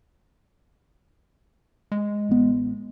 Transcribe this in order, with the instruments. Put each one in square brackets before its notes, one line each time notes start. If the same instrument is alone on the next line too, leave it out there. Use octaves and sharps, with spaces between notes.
[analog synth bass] G#3
[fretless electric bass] A1 B3